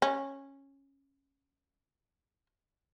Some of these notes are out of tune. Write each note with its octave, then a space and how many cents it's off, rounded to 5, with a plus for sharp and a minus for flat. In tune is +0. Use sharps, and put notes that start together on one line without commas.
C#4 -10